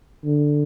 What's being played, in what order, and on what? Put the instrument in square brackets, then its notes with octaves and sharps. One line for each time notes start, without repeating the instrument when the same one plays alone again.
[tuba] D3